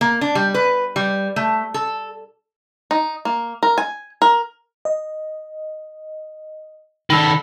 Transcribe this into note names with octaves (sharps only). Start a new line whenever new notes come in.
A#3
D4
G3
B4
G3
A3
A4
D#4
A#3
A#4
G#5
A#4
D#5
D#3 A4 B5 E6 B6